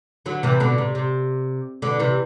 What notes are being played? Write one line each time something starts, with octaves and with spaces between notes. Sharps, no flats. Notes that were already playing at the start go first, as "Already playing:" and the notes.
D3 F#3
C3 E3
B2 D3
C3
C3
B2 D3
C3 E3